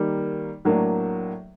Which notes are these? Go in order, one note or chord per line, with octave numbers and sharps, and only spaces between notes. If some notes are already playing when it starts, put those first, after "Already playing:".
Already playing: D#3 G3 A#3
A2 F#3 A#3 D4